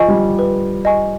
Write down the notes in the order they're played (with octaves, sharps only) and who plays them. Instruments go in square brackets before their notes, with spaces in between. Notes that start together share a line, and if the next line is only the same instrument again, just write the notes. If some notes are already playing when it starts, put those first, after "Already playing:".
Already playing: [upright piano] F3 [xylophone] D#5 G#5 C#6
[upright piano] G3
[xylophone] B4
D#5 G#5 C#6